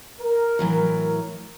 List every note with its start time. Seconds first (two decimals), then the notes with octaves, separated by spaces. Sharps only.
0.21 A#4
0.59 A2 E3 F#3